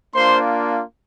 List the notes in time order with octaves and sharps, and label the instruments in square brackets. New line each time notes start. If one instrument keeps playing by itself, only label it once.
[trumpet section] A#3 D4 F4 C5 C6